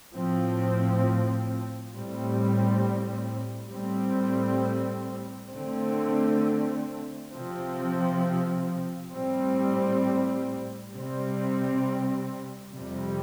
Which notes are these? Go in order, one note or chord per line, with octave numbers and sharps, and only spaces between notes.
A2 F3 C4
A2 G3 C4
A2 G3 C4
D3 A3 C4
C3 F3 C4
A2 G3 C4
C3 G3 C4
F2 C3 G3